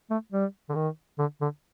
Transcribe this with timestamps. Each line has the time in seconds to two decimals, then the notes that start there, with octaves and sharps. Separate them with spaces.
0.10 A3
0.32 G3
0.69 D3
0.75 D#3
1.18 D3
1.41 D3